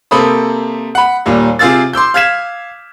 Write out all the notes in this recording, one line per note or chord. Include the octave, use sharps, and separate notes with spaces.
C3 A#3 A4 C5 B5 D#6
F#5 B5
D#2 A#2 G3
C3 F4 G#4 F5 E6 A6
C6 D6 E6 G6
F5 F6 G#6 B6 E7